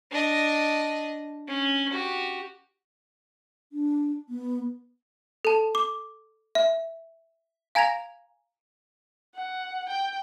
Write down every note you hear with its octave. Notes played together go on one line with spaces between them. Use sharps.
D4 D#5
C#4
F#4 G4
D4
B3
A4 A5
D6
E5
F5 G#5 A#5 G#6 A#6 F7
F#5
G5